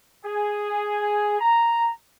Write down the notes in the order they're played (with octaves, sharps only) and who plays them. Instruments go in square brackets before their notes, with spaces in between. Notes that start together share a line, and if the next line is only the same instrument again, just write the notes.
[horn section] G#4
A#5